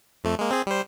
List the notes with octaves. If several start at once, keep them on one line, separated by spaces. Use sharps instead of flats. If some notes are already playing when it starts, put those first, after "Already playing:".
F2 A3
G#3 A#3
C4 G#4
G3 C5